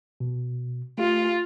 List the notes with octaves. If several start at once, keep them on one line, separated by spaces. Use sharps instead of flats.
B2
A3 F4 G4